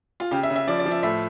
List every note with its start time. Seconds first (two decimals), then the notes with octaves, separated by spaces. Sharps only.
0.20 F4
0.31 C#3 G4
0.43 E5
0.50 C#3
0.56 E5
0.68 F3 D5
0.80 D5
0.86 F3
0.91 E5
1.03 A2 E5